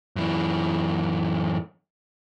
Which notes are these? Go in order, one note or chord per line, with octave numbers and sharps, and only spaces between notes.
F#2 E3